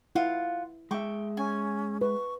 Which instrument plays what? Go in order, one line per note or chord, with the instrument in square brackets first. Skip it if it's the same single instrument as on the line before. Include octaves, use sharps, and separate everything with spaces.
[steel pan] E4 [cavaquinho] F4 F5 F#5
[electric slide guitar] G#3 E5 [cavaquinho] G5 C#6 D6
[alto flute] C#4 [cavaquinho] G#5
[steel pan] B4 [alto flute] C#6